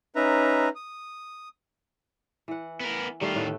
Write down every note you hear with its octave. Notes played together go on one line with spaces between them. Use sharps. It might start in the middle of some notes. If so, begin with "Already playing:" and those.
C#4 D#4 B4 E5 A#5
D#6
E3 F#5
B3 A#4
D#3 G3 A3 F4
A2 A3 B3